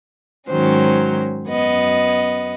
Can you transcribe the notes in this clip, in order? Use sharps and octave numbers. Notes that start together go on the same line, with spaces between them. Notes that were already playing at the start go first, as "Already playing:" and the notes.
G#2 D#3 F#3 C#4 C5
F#2 B3 D#5